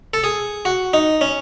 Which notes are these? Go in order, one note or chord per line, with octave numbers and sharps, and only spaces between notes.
A4
G#4
F#4
D#4
C#4